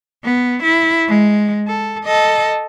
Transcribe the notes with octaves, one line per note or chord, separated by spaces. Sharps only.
B3
E4
G#3
A4
A4 D#5